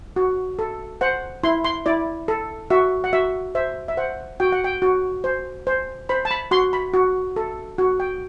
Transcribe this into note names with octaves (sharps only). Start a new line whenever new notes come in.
F#4
A4
C5 F#5
E4 C6
C6
E4 D5
A4
F#4 E5
F#5
F#4 E5
C5 E5
E5
C5 F#5
F#4 G5
F#5
G5
F#4
C5
C5
C5 B5
A5
B5
F#4 C6
B5
F#4
A4
F#4
G5